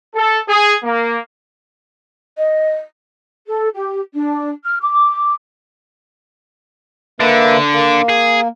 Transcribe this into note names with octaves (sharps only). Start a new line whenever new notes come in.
A4
G#4
A#3
D#5
A4
G4
D4
F6
D6
D3 A#3 B4 E5
A#3
G#4